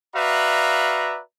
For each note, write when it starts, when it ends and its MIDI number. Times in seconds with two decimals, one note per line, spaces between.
0.15 1.20 66
0.15 1.20 71
0.15 1.20 74
0.15 1.20 76
0.15 1.20 77
0.15 1.20 82